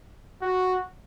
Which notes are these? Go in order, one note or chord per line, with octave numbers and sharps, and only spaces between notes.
F#4